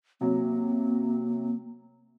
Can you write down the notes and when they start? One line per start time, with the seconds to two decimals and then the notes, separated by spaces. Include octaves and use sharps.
0.21 C3 F#3 A#3